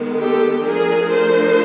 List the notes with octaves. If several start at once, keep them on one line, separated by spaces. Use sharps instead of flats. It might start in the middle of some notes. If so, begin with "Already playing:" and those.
Already playing: D#3 G#3 B3
G4 A4
F3 A3 D4 G#4 A#4
A#4 C5